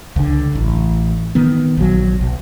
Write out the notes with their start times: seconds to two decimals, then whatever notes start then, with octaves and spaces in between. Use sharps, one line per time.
0.16 C#2 D3
0.55 A1
1.35 D#3 B3
1.77 A#1 F#3
2.21 B1